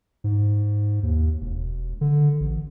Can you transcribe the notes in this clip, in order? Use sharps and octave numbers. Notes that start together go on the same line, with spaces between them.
G#2
D#2
E1
D3
A1